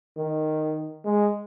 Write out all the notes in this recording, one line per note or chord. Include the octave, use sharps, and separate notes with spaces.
D#3
G#3